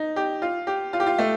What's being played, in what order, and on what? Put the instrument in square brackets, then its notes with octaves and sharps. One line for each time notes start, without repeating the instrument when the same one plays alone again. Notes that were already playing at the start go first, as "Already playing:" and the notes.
Already playing: [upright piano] D#4
G4
F4
G4
F4
G4
F4
A3